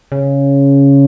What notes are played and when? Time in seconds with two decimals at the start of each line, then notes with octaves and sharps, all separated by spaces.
0.12 C#3